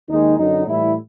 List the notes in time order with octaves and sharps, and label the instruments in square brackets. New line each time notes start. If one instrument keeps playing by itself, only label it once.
[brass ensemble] D#2 D#3 G#3 D#4
F#2 D3 F#3 D#4
A2 E3 G3 E4